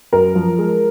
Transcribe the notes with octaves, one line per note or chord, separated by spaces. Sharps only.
F#2 A#4
F3
G#3